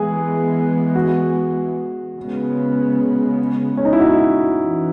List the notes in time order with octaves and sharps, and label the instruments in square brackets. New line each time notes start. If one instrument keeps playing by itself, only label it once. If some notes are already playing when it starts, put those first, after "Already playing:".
Already playing: [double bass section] E3 G#3 B3 [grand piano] G#4
[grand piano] F#4
[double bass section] C#3 G#3 B3
[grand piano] C#4
D#4
E4
F#4
[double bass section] E3